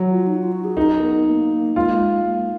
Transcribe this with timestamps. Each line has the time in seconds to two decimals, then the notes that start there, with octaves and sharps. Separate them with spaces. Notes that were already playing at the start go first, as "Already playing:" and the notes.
Already playing: F#3
0.10 F4
0.27 D#4
0.39 F4
0.52 F#4
0.65 G#4
0.77 D#4 A#4
1.02 B3
1.26 A#3
1.76 G#3 F4
2.26 A#3